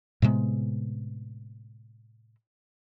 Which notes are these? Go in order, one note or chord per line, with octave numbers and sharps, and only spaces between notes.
A2 C3 G#3 B3